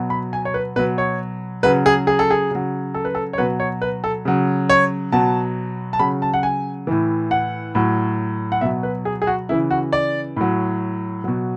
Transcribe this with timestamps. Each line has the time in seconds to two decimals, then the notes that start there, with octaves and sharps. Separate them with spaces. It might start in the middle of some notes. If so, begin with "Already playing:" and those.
Already playing: B2 F#3
0.10 B5
0.33 G#5
0.45 C#5
0.54 B4
0.76 B2 B4
0.79 F#3
0.98 C#5
1.63 C#3 F#3 B4
1.86 G#4
2.07 G#4
2.19 A4
2.30 G#4
2.51 C#3 F#3
2.94 A4
3.05 B4
3.15 A4
3.33 C#5
3.38 B2 F#3 B4
3.60 C#5
3.82 B4
4.04 A4
4.25 C#3 F#3
4.70 C#5
5.12 B2 F#3 A5
5.93 A5
5.99 C#3 F#3 B5
6.22 A5
6.34 F#5
6.43 G#5
6.87 A2 E3
7.31 F#5
7.75 A2 F#3
8.52 F#5
8.61 B2 F#3 E5
8.83 B4
9.05 G#4
9.22 G#4
9.27 F#4
9.49 C#3 E3 E4
9.71 F#4
9.93 D5
10.36 A2 F#3
11.24 B2 F#3